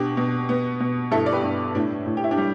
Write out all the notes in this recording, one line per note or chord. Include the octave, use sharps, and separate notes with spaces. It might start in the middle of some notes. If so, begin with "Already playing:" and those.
Already playing: B2 D4 G4
B2
B3
B2
G2 E4 A4
D5
G4 B4
G2
A2 D4
A2
G4
E4
D4 G4
G3